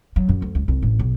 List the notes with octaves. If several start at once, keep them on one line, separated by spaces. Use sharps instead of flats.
F#3
F#2
D2
C#2
C2
A1
B1